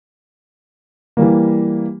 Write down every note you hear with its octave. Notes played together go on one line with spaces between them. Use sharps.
E3 G3 A#3